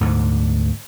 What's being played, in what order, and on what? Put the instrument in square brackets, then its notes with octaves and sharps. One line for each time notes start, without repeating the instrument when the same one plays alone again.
[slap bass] D2 G#2 D3